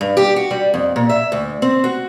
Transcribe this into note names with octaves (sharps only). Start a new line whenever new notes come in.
G2
G4
F#4
G3
F2
A#2
E5
D2
C4
F#4